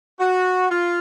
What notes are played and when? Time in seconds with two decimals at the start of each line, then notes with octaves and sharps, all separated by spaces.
0.19 F#4
0.70 F4